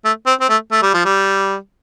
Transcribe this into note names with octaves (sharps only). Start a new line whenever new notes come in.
A3
C4
C4
A3
A3
G3
F3
G3